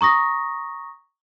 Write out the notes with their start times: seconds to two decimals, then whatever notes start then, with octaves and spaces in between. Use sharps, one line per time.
0.01 A#5 C#6 D#6 A#6